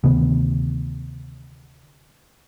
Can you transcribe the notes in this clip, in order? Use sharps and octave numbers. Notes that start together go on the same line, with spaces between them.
D2 C3 D#3 B3